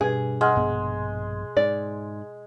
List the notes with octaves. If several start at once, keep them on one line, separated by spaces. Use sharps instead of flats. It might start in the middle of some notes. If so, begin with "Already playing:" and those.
G2 B2 G#4 B4 G#6
G#3 F#5 F6
A#1 G2 B3
G#2 D5